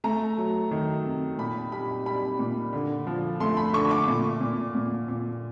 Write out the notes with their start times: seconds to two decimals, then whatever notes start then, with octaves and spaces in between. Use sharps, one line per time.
0.04 A3 A#5
0.38 F#3
0.71 D#3
1.05 C3
1.38 A#2 B5
1.72 G3 B5
2.06 G3 B5
2.39 A#2
2.73 D3
3.07 F3
3.40 A3 C6
3.57 B5
3.73 D3 C#6
3.91 D6
4.08 A#2
4.41 A#2
4.75 A#2
5.08 A#2